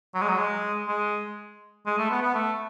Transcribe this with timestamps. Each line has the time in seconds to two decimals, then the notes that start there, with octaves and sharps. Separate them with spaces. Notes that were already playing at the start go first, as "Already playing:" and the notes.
0.15 F#3
0.21 G#3
0.29 F#3
0.38 G#3
0.88 G#3
1.86 G#3
1.98 A3
2.10 B3
2.22 B3
2.35 A3